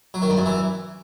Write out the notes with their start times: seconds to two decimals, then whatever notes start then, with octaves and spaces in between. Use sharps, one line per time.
0.14 F#3
0.22 D#3
0.30 G2
0.38 F#2
0.46 E3